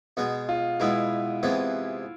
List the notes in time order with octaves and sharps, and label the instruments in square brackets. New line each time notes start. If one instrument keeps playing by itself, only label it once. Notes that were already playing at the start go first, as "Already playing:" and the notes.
[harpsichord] B2 G#3 B3
[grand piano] F4
[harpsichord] B2 G#3 B3 [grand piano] E4
[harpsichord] C3 E3 G#3 B3